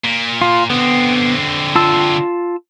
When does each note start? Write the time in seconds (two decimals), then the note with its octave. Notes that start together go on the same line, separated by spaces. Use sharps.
0.04 A#2
0.42 F4
0.70 D3 B3 C4
1.76 F4 A5 E6